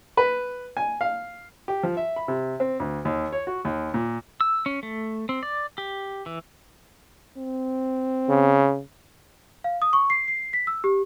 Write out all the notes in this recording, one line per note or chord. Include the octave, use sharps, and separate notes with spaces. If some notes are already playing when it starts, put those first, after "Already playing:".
B4
G#5
F5
G4
F3
E5
B5
C3
C4
D2
D#2
C#5
F#4
D#2
A#2
E6
C#4
A3
C4
D5
G4
E3
C4
C#3
F5
D#6
C#6
C7
C7
B6
E6
G4